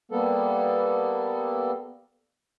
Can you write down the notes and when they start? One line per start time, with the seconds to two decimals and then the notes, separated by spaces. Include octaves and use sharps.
0.12 G3 A#3 B3 A4